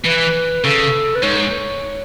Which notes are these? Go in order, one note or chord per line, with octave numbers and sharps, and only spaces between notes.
E3 B4
C#3 A4
B4
G#2 C#5